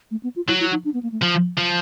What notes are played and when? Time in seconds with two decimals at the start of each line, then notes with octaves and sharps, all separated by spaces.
0.11 A3
0.23 B3
0.36 F4
0.48 F#3 E4
0.60 E4
0.72 D#4
0.85 D4
0.94 B3
1.03 A#3
1.12 A3
1.22 F3
1.58 F3